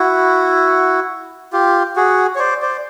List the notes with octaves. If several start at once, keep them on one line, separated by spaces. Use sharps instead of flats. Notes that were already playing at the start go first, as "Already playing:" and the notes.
Already playing: E4 F#4
F4 G4
F#4 G#4
C#5
C5 D5
C5 D5